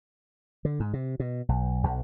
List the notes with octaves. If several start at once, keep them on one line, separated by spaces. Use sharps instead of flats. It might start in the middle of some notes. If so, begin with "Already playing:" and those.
D3
G#2
C3
B2
B1
B1